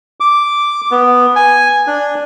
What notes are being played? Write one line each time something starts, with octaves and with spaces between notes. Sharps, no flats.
D6
B3
G#5
D4